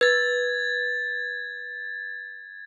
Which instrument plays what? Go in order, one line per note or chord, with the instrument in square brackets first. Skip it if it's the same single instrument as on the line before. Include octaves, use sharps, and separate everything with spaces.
[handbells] B4 [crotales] G#6 A6